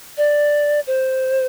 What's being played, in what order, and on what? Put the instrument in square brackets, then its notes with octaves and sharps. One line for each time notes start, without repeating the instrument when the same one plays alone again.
[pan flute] D5
C5